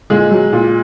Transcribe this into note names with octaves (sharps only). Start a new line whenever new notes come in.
A#2 G#3 G#4
F#3
A#2